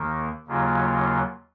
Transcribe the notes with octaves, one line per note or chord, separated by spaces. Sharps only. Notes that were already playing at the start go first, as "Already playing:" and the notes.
Already playing: D#2 D#3 A#3
D#2 C#3 F#3 A#3 F4